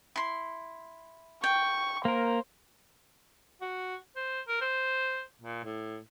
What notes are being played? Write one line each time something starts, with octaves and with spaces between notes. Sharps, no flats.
E4 C6
G5 C#6
A#3 A#4 C5
F#4
C5
A#4
C5
A#2
A2